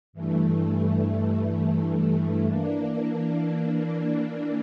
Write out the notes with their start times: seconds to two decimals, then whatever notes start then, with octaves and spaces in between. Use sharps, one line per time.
0.13 G2 E3 A3
2.46 E3 A#3 D4